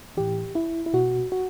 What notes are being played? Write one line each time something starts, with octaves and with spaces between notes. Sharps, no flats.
A2 E3 G4
E4
E4
B2 F#4
F#4